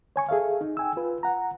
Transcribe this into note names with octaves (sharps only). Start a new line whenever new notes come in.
C#5 G#5 C#6
G#4 A4 E5 F5
D#4
G5 G#5 E6
F4 B4
F#5 A#5